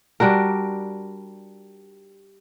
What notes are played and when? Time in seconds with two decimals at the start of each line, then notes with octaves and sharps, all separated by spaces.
0.20 G3 D4 F#4 A#4